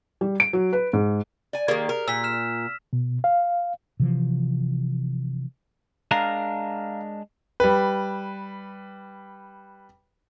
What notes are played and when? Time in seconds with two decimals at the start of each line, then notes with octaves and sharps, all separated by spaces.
0.21 G3
0.40 D7
0.53 F#3
0.73 B4
0.93 G#2
1.53 D5 G#5
1.68 D#3 A#3 G4 G#4 D5
1.89 A#4
2.08 A#2 E6 B6
2.24 F6 E7
2.93 B2
3.24 F5
4.00 C3 E3 F3
6.11 G#3 D4 A#4 F5 A#5
7.60 G3 B4